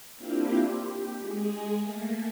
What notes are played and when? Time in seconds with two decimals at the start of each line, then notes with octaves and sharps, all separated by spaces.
0.17 A#3 C4 D4 E4 F4 G4
0.84 G4
1.20 G#3 G#4
1.79 A3 A#3